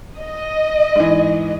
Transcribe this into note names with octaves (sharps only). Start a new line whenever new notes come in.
D#5
G#2 E3